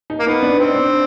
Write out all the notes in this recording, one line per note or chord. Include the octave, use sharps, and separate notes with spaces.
D#4
A#3
B3 D#4
D4
C4 D#4
D4